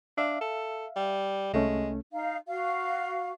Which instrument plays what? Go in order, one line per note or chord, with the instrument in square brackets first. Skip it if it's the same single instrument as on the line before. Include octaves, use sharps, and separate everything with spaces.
[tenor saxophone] D4 [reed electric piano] E5 F5
[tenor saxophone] A4
G3
[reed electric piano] C2 A3 C#4 [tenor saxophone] G#3
[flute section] D#4 F5
F#4 F5